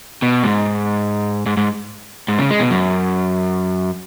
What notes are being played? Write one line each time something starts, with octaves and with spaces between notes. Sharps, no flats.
B2
G#2
G#2
G#2
G#2
C#3
G#3
B2
F#2